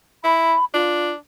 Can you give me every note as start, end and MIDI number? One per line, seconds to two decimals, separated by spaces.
0.24 0.55 64
0.24 0.65 83
0.74 1.15 62
0.74 1.12 65